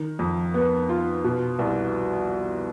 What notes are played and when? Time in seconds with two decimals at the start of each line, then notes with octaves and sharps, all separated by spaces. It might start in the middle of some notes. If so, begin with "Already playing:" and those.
Already playing: D#3
0.19 F2
0.54 B3
0.89 F4
1.24 B2
1.59 C2